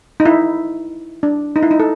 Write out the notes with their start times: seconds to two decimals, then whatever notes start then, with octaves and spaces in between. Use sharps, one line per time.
0.20 D#4
0.26 E4
1.23 D4
1.56 D#4
1.63 E4
1.71 D#4
1.80 A4